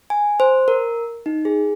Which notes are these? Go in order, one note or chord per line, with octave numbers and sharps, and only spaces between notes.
G#5
C5
A#4
D#4
G#4